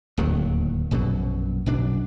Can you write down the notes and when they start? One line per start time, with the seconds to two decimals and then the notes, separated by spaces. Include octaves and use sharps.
0.18 D1 D#2 D#3 F#3
0.91 A#1 F#2 B2 F#3
1.66 B1 F#2 D4